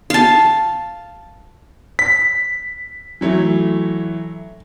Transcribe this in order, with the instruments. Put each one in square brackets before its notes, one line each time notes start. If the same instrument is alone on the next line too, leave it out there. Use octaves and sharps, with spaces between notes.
[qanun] F5 A5
[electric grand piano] B6
[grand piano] E3 F#3 A3